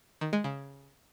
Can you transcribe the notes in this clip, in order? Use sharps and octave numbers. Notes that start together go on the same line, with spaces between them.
D#3
G#3
C#3